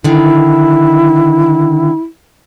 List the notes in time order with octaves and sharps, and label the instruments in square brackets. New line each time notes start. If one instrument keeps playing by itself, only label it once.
[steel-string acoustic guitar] D3 D#3 [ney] E4